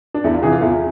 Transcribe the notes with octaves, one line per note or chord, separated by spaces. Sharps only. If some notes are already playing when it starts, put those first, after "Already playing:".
D4
E2 E4
F4
C3 E3 G#4
F4
E2 E4